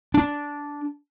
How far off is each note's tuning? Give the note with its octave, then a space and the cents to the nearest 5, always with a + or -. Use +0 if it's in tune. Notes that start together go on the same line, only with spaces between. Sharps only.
D4 -10